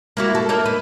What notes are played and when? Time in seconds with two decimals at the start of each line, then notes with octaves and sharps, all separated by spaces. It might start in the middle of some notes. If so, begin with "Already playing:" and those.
0.17 A#3 E4 F#4
0.35 A4
0.49 A#3 D#4 E5
0.65 B4